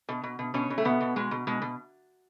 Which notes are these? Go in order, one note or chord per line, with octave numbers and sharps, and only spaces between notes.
B2
B2
B2
B2 C#4
B2
A3
B2 B3
B2
B2 G#3
B2
B2 G#3
B2